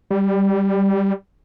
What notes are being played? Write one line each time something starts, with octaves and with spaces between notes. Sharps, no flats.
G3